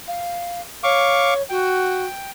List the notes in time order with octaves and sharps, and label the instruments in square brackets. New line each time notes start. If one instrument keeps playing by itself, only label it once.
[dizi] F5
[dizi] C#5 [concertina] F5 C#6 D6
[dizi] F#4 [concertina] G5